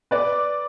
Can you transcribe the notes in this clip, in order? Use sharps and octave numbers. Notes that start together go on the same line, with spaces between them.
B4 D5